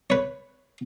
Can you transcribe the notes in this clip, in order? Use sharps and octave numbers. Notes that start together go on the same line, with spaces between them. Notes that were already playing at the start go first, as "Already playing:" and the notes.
B4 C#5